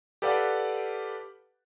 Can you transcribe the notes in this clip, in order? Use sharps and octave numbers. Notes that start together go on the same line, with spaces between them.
G4 A4 B4 D5 F5 F#5